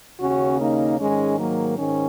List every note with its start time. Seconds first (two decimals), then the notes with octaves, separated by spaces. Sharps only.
0.20 D#2 C#3 C#4 F#4
0.60 A#3 D#4
0.99 G#2 D#3 G#3 C#4
1.39 F#3 A#3
1.79 G#2 D#3 C#4